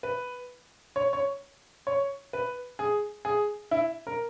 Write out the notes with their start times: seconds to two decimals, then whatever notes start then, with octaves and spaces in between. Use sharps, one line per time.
0.03 B4
0.96 C#5
1.13 C#5
1.87 C#5
2.33 B4
2.79 G#4
3.25 G#4
3.71 E4
4.07 A#4